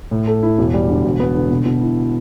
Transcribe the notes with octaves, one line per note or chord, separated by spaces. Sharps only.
A2
A4
E4
E1
G3
D3
E1
B3
D3
B2
B2
E4